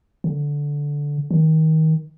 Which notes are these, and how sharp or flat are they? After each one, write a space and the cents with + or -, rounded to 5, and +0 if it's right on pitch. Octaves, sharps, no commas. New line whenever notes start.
D3 -10
D#3 +25